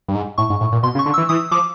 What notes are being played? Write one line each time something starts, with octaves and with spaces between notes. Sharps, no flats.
G2
G#2
A2 C#6
G#2
A2
A#2
B2 C6
C#3
C#6
D3
E3 E6
E3 D#6
F3 D6